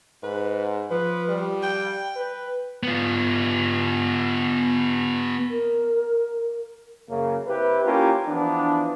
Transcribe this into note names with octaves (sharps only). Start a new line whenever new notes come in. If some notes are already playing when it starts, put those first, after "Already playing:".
G#2 B4
F3 B4
G3
G5
B4
B3 F4
A#4
F#2 C#3 A#3
C4 E4 G4 B4
A#3 C#4 E4 F4 G4 A#4
E3 F3 B3 D4